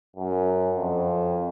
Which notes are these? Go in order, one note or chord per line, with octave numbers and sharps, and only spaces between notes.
F#2
F2